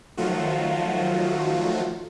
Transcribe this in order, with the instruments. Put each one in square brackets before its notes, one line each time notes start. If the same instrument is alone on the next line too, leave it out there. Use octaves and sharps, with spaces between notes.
[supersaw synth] D#3 F3 F#3 A3 F4 F#4